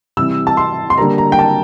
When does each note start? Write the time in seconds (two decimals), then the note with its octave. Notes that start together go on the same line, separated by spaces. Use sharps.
0.17 C3 E3 G3 E6
0.47 A5
0.57 C6
0.90 C6
0.98 D3 G3 A#3 A#5
1.18 A#5
1.32 G5
1.39 A5